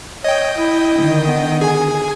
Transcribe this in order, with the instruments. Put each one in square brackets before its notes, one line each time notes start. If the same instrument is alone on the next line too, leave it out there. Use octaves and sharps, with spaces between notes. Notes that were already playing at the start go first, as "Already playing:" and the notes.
[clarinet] C#5 [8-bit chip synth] D#5 G5
[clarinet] E4
[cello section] D3 D#3
[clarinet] B3
[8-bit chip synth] G#4 G#5